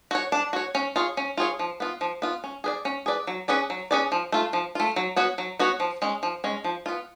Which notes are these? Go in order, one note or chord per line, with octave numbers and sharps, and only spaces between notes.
F#4 C#5
D4
F#4 C#5
C#4
F4 G#4 C#5
C#4
F4 G#4 C#5
F3
B3 F4
F3
B3 F4
C#4
G#4 B4 D5
C#4
G#4 B4 D5
F#3
C#4 G#4 B4 D5
F#3
C#4 G#4 B4 D5
F3
A3 F4
F3
A3 F4
F#3
B3 F#4 C#5
F#3
B3 F#4 C#5
F3
G#3 C#4
F3
G#3 C#4
F3
B3 F4